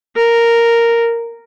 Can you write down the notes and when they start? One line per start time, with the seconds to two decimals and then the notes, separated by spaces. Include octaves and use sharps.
0.16 A#4